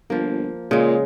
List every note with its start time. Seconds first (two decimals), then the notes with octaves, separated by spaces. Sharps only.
0.10 G1 F3 A#3
0.71 A#2 C#3 G#3